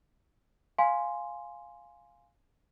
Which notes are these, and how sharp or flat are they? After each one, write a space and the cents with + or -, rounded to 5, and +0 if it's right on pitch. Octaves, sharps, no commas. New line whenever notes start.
F5 +0 G#5 +0 C6 +0